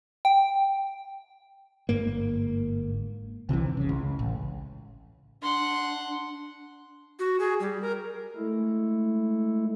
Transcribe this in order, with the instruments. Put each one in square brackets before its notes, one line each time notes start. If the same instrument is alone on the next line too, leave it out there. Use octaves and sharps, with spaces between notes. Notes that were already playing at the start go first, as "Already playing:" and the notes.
[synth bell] G5
[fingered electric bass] G1 G#2 A#3
[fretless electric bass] C2 C3 D#3 E3
F#1 C#3
C#2
A1
[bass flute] D4 [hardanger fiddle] F#5 C6
[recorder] F#4
G#4
G3
A#4
[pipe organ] G#3 A3 E4 A4